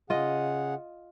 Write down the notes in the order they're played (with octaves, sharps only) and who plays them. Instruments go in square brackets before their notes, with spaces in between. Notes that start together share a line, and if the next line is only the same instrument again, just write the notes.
[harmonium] C#3 G#4 F#5 [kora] F4 D#5